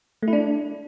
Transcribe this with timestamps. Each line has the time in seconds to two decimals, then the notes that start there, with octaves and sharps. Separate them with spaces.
0.22 A3
0.28 E4
0.33 D4